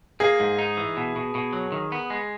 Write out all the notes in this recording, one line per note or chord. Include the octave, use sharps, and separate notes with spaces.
A#3 G#4
G#2
D#4
E3
B2
B2
B2
F#3
D#3
B3
G#3